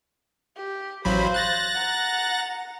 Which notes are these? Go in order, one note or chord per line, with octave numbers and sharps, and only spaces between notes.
G4
A1 F#3 C5 F5 B5
F#6 A6 A#6
F#5 A#5